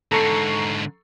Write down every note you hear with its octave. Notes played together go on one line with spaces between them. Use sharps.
G#2 D3 A4 A#5 C#6 C7